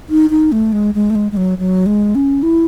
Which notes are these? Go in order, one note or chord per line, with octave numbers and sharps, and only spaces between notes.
D#4
D#4
A3
G#3
G#3
A3
G#3
G#3
F#3
F#3
G#3
C#4
E4